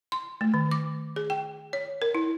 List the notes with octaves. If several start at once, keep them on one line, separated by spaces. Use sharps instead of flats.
C6
A3
D#3
D6
G#4
G5
C#5
A#4
E4